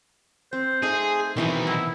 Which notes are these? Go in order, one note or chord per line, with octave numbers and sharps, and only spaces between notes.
C4 C5
A3 D#4 G#4
B2 D#3 E3 C4 D#4
E4 F#5